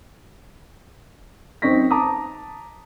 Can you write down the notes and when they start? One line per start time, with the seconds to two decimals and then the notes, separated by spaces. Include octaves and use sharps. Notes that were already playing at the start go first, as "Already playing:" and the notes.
1.62 F#2 C4 D#4 C#6 A#6 B6
1.91 A5 A#5 D6 D#6